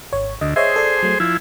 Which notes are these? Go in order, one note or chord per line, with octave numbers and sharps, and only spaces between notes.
G#1 C#5
D2 D#5
G#4 C5 C#5 D#5 E5
A4 D5
F#3 A3
F3 E4 G#6